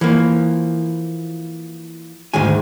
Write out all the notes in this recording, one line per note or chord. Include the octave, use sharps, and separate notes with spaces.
E3 F3 A#3
D2 G#2 D#3 G#3 G#5